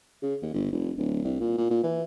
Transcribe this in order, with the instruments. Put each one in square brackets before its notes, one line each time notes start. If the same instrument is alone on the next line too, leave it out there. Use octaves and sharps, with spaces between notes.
[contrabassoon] C#3
D#2
G1
F1
D1
C2
A#2
A#2
A#2
E3